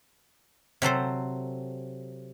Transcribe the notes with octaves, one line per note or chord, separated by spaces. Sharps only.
C3 F#3 A4 C5